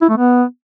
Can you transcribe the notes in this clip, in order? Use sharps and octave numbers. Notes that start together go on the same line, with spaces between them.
E4
A3
B3